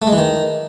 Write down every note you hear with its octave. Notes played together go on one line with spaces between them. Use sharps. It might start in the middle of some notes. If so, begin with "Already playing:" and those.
A3
G#3
E3
D#3